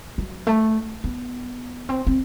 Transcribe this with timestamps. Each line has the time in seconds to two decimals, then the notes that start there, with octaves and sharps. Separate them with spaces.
0.18 F#3
0.47 A3
1.04 B3
1.89 C4
2.07 C4